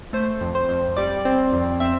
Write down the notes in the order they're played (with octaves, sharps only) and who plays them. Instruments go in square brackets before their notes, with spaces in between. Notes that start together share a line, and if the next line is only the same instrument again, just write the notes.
[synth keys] A3 C5
F2
C5
F2
G3 D5
C4
F2
C4 E5